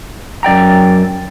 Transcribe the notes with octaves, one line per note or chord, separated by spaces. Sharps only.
F#2 D5 G5 A#5